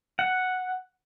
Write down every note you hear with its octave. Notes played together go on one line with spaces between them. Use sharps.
F#5